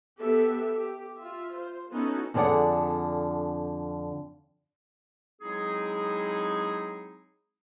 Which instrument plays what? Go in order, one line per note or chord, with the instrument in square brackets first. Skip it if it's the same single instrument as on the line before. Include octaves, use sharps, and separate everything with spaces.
[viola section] B3 G4 A4 E5
G4
F4 E5
C5
B3 C#4 D#4 E4 F#4 A4
[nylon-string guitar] F2 D3 D4 G#4 D5 F#5
[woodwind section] F#3 G#3 C4 D#4 E4 G#4